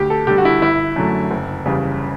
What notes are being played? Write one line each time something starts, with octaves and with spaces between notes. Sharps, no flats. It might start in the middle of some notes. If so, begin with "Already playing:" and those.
Already playing: D2 G4
A4
D3 G3 G4
F#4
E4
G1 E4
F#2 D3 F#3 A3
F#1
E2 C#3 G3